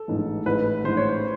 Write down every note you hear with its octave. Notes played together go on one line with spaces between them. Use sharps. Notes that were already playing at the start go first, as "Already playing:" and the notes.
Already playing: A4
A1 G#2 E3
A1 G#2 E3 B4
A1 G#2 E3 C5
C#5
C5